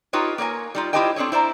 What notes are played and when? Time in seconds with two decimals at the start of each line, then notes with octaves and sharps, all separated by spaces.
0.13 D#4 F4 G4 B4 C#5
0.38 A#3 A#4 C#5 G#5
0.75 G3 D#4 F4
0.93 E4 F4 G4 C5 D#5 G5
1.16 C4 D4 G#4 A4 C#5
1.32 E4 C5 D5 A#5